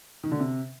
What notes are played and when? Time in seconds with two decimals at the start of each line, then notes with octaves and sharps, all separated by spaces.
0.24 D#3
0.31 D3
0.39 C3